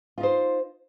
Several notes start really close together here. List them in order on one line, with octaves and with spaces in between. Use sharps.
F4 D#4 C5